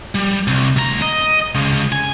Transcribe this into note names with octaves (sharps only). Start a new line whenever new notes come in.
G3
C2
D2 A#5
D#5
C#3 G#3
G#5